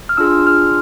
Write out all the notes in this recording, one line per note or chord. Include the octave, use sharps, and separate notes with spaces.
F6
D4 F4 G#4 E6
F6